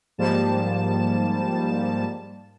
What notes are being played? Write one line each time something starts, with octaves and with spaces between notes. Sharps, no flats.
G#2 F3 G3 A#3 A5 E7